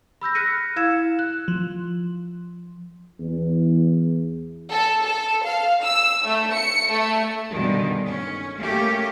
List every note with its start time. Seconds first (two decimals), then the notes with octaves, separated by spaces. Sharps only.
0.21 B5 E6 G6 A#6
0.35 F6 F#6 A#6 B6 C#7 D#7
0.76 E4 F5 E6 G#6 C#7 E7
1.19 F#6
1.48 F3
3.20 E2
4.72 A4
5.03 A4
5.46 F5
5.84 E6
6.26 A3
6.54 C#7
6.90 A3
7.51 G2 B2 D3 D#3 G3 G#3
8.06 C#4
8.58 A3 A#3 C#4 G4